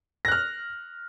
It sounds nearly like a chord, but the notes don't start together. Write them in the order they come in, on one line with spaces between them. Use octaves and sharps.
A#6 F#6 F6